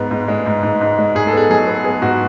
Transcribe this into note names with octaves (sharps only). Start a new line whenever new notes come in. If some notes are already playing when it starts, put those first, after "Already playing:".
Already playing: G#2 B3
G#2
G#3
G#2
G#2
G#2
G#3
G#2 G#4
A4
B3 G#4
F#3 G#4
B3
B3 G#4
G#2 F#4